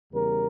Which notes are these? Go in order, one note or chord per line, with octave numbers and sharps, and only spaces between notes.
E2 C#3 G3 A#4